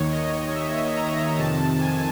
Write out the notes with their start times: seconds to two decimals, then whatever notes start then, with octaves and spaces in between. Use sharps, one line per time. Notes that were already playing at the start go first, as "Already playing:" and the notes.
Already playing: D#2 D#3 C#5
0.12 D#5
0.54 E5
0.96 A#5
1.38 F2 C3 D#3 A5
1.81 G#5